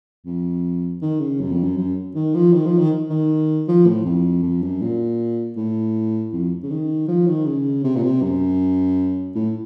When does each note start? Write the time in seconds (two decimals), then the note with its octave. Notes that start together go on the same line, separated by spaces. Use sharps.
0.26 F2
1.02 D#3
1.20 C#3
1.40 F#2
1.52 F2
1.63 F#2
1.77 F#2
2.15 D#3
2.34 F3
2.53 D#3
2.66 F3
2.78 D#3
3.10 D#3
3.68 F3
3.87 A2
4.05 F2
4.42 F2
4.62 F#2
4.81 A#2
5.57 A2
6.32 F2
6.63 C#3
6.71 D#3
7.08 F3
7.27 D#3
7.46 C#3
7.84 C3
7.96 A#2
8.03 C3
8.22 F#2
9.35 A2